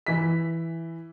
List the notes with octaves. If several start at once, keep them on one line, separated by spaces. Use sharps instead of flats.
E3 B6